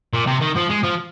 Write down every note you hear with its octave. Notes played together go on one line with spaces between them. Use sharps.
A#2
C3
D#3
F3
G#3
F3